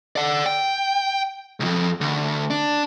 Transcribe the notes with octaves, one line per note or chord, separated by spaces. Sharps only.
D5 F#5
G5
C2 F2
D2
D4